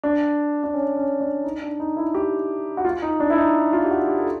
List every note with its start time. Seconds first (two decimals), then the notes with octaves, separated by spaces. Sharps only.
0.03 D4
0.64 D4
0.74 C#4
0.97 C#4
1.21 D4
1.44 D#4
1.62 D4
1.80 D#4
1.96 E4
2.14 G4
2.77 F#4
2.85 F4
3.02 D#4
3.20 D4
3.30 E4
3.38 D#4
3.73 F4
3.84 G4
3.90 F#4
4.08 G4
4.19 A4